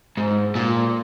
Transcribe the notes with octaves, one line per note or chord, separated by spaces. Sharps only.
G#2
A#2